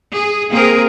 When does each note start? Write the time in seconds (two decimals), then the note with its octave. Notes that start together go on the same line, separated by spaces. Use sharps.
0.14 G#4
0.50 A#3 C4 G#4 A#4